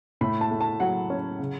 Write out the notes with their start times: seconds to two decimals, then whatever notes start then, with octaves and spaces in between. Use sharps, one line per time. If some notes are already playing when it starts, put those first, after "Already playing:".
0.21 A2 B5
0.41 A5
0.51 A3
0.61 A5
0.80 F#3 F#5
1.10 C#4
1.39 C#3